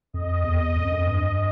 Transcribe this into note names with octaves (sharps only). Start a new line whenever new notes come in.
F2 D#5
E2
F2
F#2
F2
G2